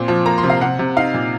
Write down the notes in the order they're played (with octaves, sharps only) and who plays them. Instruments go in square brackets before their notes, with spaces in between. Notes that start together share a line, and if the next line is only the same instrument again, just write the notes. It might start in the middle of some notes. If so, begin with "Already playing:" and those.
Already playing: [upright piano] A#2 C4 C6
F3
A#3 A#5
C6
C3
F5
C3 F#5
C3
D#4 F5
A#2